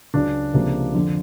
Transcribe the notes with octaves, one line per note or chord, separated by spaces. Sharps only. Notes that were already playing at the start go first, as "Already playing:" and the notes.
C#2 C#3 F#3 D4
C#2 C3 F3 A#3
F2 D3 F3